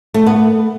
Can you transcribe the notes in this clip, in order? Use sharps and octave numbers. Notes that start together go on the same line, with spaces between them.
A3
B3